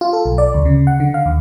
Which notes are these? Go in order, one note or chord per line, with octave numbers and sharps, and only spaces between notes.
F4
A4
B1
D5
D2
C#3
F#5
D3
F5
D#2